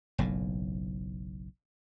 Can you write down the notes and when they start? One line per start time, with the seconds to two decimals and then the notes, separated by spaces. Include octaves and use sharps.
0.18 F#1 B1 A2